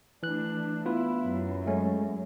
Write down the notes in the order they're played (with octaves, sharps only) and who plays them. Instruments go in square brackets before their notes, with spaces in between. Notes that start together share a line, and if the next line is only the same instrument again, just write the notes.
[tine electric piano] E3 F#6 [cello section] A3 D4
[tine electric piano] B3 F4 B4 [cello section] E4
[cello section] F#2
[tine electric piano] G#3 A3 C#4